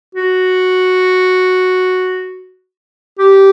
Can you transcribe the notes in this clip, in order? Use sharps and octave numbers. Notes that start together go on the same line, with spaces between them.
F#4
G4